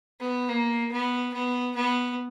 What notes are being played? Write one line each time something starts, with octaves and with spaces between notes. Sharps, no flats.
B3
A#3
B3
B3
B3